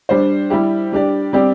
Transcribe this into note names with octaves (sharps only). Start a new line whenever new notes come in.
G3 D4 C5
G3 E4 G4
G3 D4 G4 D5
G3 C4 G4 D5